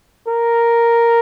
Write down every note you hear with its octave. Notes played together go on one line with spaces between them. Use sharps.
A#4